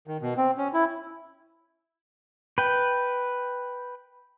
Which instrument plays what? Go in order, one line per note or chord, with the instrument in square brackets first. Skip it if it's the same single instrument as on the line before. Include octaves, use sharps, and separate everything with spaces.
[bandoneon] D#3
B2
C4
C#4
E4
[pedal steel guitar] B4 G5